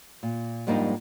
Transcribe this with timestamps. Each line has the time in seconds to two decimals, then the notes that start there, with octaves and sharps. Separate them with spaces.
0.23 A#2
0.67 F2 G#2 G3 A#3 D4 D#4